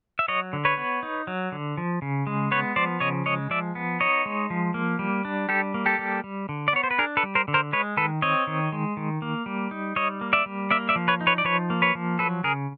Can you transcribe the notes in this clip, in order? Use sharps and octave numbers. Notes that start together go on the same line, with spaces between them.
E5
F#3 C#5 D#5
D3
B4 C#5
B3
D#4
F#3
D3
F3
C#3
G#3
B3 B4 C#5
F3 C5 D5
C#3 C#5 D#5
G#3 C#5 D#5
F3 D5 E5
B3
D#4 C#5 D#5
G#3
F3
A#3
G3
D4
G3 G4 A4
A#3
G4 A4
G3
G3
D3
D5
B3 C#5
C5
B4
D4 G#4 A#4
A4 B4
G3
A#4 C5
D3
A#4 C5
G#3 B4 C#5
D#3 A4 B4
C4 C#5 D#5
D#3
G#3
D#3
A#3
G3
D#4
G3 C#5 D#5
A#3
D5 E5
G3
A#3 D5 E5
D5 E5
F3
B4 C#5
D#4
B4 C#5
D5
F3 B4 C#5
A#3
B4 C#5
F3
F#3 A4 B4
C#3 G#4 A#4